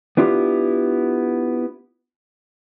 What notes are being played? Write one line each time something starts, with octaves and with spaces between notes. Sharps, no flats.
B3 D4 E4 F4 G4